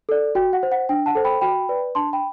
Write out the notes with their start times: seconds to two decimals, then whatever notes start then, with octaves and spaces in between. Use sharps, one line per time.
0.09 A4 D5
0.35 F#4 G5
0.53 F#5
0.63 C5
0.72 F#5
0.89 D4 G5
1.06 F#5 A5
1.15 A4 C5
1.24 G5 B5
1.41 F#4 G5 B5
1.69 B4 D5
1.95 D4 A5 C6
2.13 G5 B5